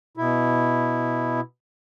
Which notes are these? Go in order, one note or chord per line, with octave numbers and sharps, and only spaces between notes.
B2 E4